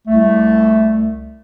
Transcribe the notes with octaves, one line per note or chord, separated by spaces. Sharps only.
C2 A3